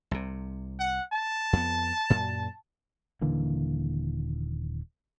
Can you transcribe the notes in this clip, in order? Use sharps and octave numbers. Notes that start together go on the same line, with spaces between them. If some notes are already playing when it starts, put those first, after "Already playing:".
C2 C3
F#5
A5
F2 B3
F#2 A#2
D#1 D3 E3 A#3